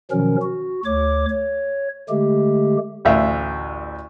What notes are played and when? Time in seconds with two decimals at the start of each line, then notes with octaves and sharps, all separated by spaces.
0.11 B2 D#3 F3 F#3 C#4 A#4
0.42 F#4
0.85 D2 C#5 D6
1.29 C#5
2.09 D3 G#3 A3 G4
3.05 A1 D2 E5 F5